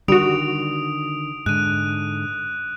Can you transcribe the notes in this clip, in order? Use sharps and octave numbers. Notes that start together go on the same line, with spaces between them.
D3 D#3 G3 F#4 D#6 D7 F7
G#2 D3 F#6 D#7